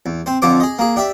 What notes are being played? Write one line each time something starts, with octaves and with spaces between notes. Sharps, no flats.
E2
C4 C5
F2 D3 F3 C5 D6
G#4 D#5
A#3 G#4
D4 G4 E5